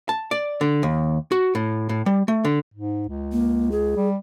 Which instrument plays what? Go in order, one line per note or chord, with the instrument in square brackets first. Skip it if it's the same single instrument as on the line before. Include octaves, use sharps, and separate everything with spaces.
[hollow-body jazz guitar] A5
D5
D3
D#2
F#4
A2
A2
G3
A3
D3
[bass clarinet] G#2
C#2
[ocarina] A#3
G#4
[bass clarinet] G3